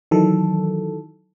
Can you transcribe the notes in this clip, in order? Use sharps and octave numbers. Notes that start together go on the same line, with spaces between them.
D#3 E3 F#3 A4